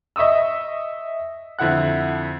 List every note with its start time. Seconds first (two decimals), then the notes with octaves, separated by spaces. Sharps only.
0.16 D#5 E5 C#6 D#6 E6
1.59 F2 D3 E4 F#5 F#6